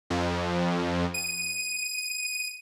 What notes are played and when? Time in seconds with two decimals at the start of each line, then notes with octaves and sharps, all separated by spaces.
0.10 F2
1.14 D#7